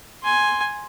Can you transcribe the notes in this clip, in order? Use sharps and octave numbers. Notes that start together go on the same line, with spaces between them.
G#5 C6